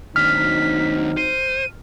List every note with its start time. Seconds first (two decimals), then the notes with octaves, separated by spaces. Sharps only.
0.16 D#2 F#3 C4 D4 D#4 F6 B6
1.17 C5 D#7